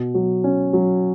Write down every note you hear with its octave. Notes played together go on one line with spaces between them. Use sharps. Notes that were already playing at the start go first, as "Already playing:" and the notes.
Already playing: B2
F#3
C#4
F#3